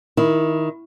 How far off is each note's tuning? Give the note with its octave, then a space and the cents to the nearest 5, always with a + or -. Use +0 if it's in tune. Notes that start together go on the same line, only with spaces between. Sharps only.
D#3 +15 E4 +0